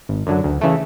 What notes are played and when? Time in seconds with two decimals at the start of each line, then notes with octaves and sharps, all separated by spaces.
0.09 G#1
0.27 F#2 D3 F#3
0.44 D2
0.61 C#3 E3 A3